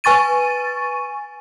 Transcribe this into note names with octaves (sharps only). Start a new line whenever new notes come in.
B4 G#5 C#6 A6 D#7